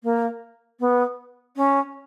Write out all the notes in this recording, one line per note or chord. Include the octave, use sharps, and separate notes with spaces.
A#3
B3
C#4